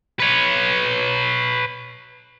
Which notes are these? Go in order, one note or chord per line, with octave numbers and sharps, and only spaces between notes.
B4 C#5